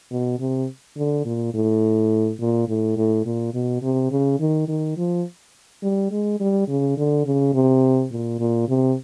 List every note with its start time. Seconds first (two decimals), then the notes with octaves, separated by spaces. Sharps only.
0.11 B2
0.40 C3
0.97 D3
1.25 A#2
1.54 A2
2.40 A#2
2.69 A2
2.97 A2
3.26 A#2
3.54 B2
3.82 C3
4.11 C#3
4.40 D#3
4.68 D#3
4.97 F3
5.83 G3
6.11 G#3
6.40 G3
6.68 C#3
6.97 D3
7.26 C#3
7.54 C3
8.11 A#2
8.40 A#2
8.68 C3